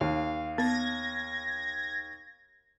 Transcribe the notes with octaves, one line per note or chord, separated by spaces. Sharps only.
D#2 F5
B3 G#6 A#6